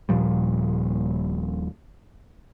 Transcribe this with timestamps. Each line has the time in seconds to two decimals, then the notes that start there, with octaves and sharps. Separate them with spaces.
0.09 D#1 A#2 F3 G3